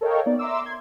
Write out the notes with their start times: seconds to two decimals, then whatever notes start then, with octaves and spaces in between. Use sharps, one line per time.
0.01 A4 A#4 C#5 D#5 F5 G5
0.26 B3 D#4 D5
0.39 E5 A#5 C6 D6 E6
0.63 C6 G#6